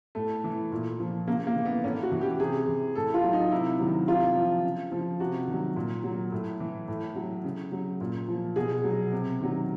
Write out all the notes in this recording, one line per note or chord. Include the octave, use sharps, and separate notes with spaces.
A2 A3
E3
A#2
F3
C#3 A#3
A#3
E3
B3
A2 C#4
F#4
E3
G4
C3 G#4
E3
A2 A4
F4
F#3
D#4
C3 E4
D#3 F#3
C3 F4
F3
C#3
F3
C3 F#4
D#3
F#3
A#2
F#3
A2
E3
A2
F#3
C#3
F#3
A#2
F3
B2 G#4
F#3
C3
D#3 F#3